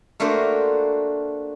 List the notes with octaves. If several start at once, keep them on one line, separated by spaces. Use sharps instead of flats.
A3 A#3 D4 F#4 A#4 C5